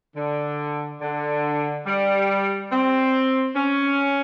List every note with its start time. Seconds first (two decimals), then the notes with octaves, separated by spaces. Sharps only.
0.16 D3
1.02 D3
1.86 G3
2.72 C4
3.56 C#4